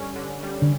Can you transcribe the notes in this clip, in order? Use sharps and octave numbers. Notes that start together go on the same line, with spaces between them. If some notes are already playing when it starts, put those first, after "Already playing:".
Already playing: G2 D3 G3 C#4
D3
G3
D3